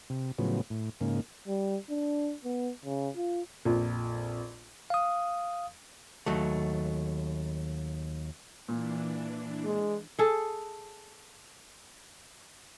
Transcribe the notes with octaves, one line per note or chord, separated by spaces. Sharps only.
C3
A2 C#3 F3 F#3 B3
A2
G#2 C#3 A#3
G3
D4
B3
C#3
F4
A#1 F2
F5 D#6
D#2 F#3 A3
A#2 E3 D4
G#3
G#4 A4